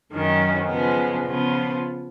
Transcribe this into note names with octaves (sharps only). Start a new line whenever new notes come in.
F#2 D#3 F#3 C#4
C#3 F3 G#3 B3
C#3 F3 B3 F4